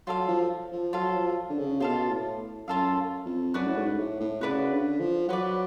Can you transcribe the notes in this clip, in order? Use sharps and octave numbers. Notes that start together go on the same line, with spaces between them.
F#3 F4 A4 F5
F3
F3
F#3 F4 A4 F5
F3
D3
C#3
B2 F4 A4 F5
A2
F#2 F4 A4 F5
F2
F#2 F#4 B4 D5
A2
G#2
A2
A2
C#3 F#4 B4 D5
D3
F3
F#3 F#4 B4 D5